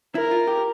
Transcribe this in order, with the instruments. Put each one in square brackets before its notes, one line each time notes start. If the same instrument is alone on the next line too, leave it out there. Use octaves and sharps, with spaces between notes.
[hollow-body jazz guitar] E4 [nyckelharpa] A#4
[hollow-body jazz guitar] F4
G4